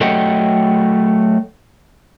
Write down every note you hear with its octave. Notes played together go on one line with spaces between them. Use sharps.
F#3 A3 A4 D#5 F#5 G5